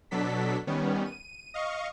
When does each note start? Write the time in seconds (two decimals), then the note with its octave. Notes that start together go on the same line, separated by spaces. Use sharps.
0.11 B2 F#3 D4 A4 B6
0.67 D#3 G3 B3 C#4
1.06 D#7
1.54 D#5 F5 C#6